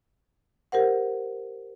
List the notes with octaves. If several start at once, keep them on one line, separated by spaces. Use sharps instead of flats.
G4 A#4 C5 F#5